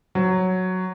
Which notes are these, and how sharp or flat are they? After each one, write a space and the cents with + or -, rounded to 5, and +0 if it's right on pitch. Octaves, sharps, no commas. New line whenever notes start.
F#3 +0 C5 +0